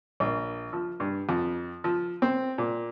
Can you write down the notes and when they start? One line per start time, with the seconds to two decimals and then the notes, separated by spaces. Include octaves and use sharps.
0.20 A#1
0.73 F3
1.00 G2
1.29 F2
1.84 F3
2.22 C4
2.58 A#2